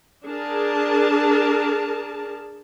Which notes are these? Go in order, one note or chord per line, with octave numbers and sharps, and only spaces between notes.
D4 G#4 A#4 A5